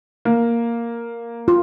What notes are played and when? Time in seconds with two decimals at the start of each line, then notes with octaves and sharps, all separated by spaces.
0.25 A#3
1.48 F4